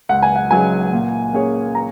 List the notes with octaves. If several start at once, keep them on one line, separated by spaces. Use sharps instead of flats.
C#2 F#5
G#5
F#5
C#3 F#3 D#4 G#4 G#5
A#2
A#3 C#4 G#4 C#5
A#5